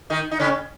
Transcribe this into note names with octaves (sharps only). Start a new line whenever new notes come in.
D#3 D#4
D#4
C#3 C#4